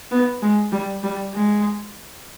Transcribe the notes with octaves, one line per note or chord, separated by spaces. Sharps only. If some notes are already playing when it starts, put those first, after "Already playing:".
B3
G#3
G3
G3
G#3